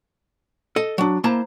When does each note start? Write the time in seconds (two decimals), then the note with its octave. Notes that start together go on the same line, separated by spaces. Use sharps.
0.76 A4 D#5
0.98 F#3 D4
1.24 A#3 E4 C5 A5 A#5